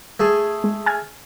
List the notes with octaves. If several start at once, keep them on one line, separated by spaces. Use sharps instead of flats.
A3 G#4
G#3
G#5 F6 G#6